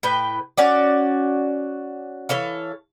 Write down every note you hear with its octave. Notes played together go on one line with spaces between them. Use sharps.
A2 B4 G5
C#4 F#4 D5
E3 A4 C#5 F5